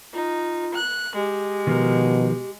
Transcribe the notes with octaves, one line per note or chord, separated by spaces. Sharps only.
D#4 F4
F#6
G#3 G4
B2 D#3 F3 A#4